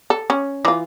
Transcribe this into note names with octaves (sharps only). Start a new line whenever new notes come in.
A4
C#4
E3 F4